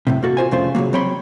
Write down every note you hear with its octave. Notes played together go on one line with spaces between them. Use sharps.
F#2 A2 C3
A#3 F#4 A4
F4 C5 G#5
C2 F2 C#3 A3 F4 C5
C#3 F3 F#3 A#3
F#3 C4 C#5 G5 B5 C6